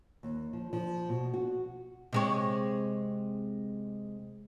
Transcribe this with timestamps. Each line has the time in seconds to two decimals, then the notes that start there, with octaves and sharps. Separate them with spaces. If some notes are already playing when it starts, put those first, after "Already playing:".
0.23 D#2
0.53 F3
0.73 F3
1.09 B2
1.34 F#4
2.13 C3 G#3 C#5